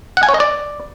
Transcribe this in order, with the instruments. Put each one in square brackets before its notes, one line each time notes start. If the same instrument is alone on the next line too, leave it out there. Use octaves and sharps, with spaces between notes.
[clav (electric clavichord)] F#5
G#5
C#5
D#5
D5